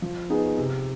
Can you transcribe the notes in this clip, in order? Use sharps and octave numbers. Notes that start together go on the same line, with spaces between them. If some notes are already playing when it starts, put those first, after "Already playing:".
F3
B3 D#4 G#4
C3